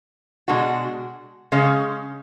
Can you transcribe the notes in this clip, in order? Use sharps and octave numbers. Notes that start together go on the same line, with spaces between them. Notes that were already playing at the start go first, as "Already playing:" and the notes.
B2 G#3 D4 F#4
C#3 G#3 C#4